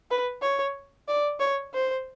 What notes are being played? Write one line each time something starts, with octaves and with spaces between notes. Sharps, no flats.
B4
C#5
D5
C#5
C5